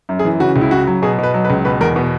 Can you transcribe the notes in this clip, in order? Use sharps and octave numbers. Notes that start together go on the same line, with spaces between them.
F#2
G#4
E3
C#3 F#4
C#2
E4
C#3 F#4
F#3
B2 G#4
B2 B4
F#3
B4
C#2
B2 B4
E2 A#4
B2 B3